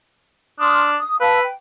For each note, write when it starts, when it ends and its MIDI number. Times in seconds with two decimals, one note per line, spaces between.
0.60 0.97 62
0.60 0.88 84
0.60 0.88 87
0.60 0.88 89
0.98 1.16 87
1.20 1.45 71
1.20 1.39 77
1.20 1.39 81
1.20 1.39 88
1.41 1.54 79